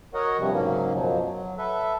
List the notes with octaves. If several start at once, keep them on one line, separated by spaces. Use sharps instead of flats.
F#4 A#4 C#5 D#5 F#5
G2 C3 F3 G3
G#2 C#3 F#3 A#3 C#4
F#2 B2 F3 F#3
F#3
A4 B4 E5